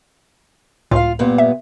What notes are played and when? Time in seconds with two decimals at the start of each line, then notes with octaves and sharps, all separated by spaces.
0.91 C#2 A2 F4 F5
1.19 G2 A#2 B3
1.38 E5